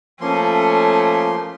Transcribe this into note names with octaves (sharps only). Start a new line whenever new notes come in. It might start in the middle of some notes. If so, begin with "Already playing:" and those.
F3 A3 A#3 C#4 C6